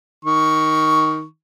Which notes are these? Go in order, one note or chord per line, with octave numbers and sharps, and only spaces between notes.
D#3 C#6